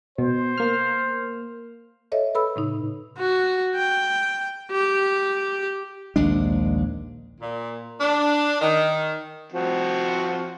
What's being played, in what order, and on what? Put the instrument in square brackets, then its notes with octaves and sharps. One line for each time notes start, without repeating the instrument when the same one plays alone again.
[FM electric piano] B2 [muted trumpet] C5
[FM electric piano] A#3 F6
[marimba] A4 C#5 D#5 E5
A4 B4 B5 E6
A2 C#3 D#4
[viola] F#4
G5
G4
[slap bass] A#1 D#2 G#3 D4
[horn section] A#2
D4
D#3
[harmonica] F3 C4 F#4